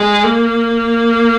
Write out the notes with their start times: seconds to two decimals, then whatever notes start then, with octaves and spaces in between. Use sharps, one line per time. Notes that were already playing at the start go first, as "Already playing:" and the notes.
Already playing: G#3
0.24 A#3